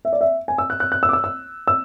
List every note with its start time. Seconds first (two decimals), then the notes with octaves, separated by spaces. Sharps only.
0.05 E5
0.13 D5
0.21 E5
0.48 G#5
0.58 E6
0.70 F#6
0.80 F#6
0.92 F#6
1.03 E6
1.09 D6
1.13 E6
1.24 E6
1.68 E6